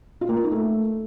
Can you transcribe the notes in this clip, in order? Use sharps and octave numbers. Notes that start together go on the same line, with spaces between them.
F4
A#3
A#4
D#4
A3